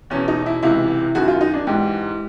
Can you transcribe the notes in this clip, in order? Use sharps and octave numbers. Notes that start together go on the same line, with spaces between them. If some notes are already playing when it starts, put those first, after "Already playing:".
E2 B2 C#4
D#4
E4
C#2 C3 E3 E4
F#2 D#3 F#4
F4
D#4
D4
G#2 E3 G4